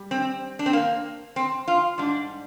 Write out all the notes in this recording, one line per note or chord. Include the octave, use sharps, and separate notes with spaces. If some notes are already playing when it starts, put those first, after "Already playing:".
Already playing: G3
C4
D4
C4
A#3
C4
F4
G#2 G3 D4